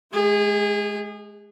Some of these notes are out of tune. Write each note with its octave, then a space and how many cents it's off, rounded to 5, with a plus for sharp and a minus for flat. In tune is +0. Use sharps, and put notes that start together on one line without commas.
G#3 +25 G#4 -30